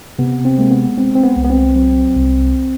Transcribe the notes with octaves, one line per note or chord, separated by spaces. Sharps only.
C3 B3
C4
G#3 A#3
B3
G#3 C4
C4
B3
C2
B3
C4
F#3 C4
C2